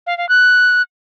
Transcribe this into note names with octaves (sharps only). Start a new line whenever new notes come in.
F5
F5
F#6